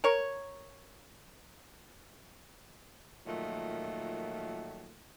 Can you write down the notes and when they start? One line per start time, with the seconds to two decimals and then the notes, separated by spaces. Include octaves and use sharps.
0.04 A#4 C#5
3.26 A#2 D#3 F3 F#3 A3